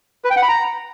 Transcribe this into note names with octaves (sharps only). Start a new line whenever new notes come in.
B4
G5
F#5
B5
A#5